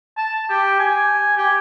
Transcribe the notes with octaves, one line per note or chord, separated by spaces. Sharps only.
A5
G4
G#5
G4